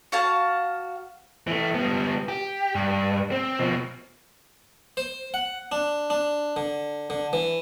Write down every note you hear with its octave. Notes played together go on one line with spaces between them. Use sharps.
F#4 F5 A5
E3 A3
G3 B3
G4
G2
C4
B2 F3
C5
F#5
D4
D4
D3
D3
E3